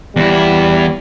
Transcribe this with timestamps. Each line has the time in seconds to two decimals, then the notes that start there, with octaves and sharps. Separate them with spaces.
0.16 E2 G3 E4